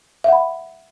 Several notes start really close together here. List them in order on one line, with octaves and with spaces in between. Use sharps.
E5 F#5 B5